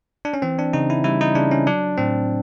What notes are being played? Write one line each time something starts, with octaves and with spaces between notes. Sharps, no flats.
D4
C#4
E3 C4
D4
C#3 D#4
E4
G3 E4
D#4
C#3 D4
C#4
F#3 D4
A2 C4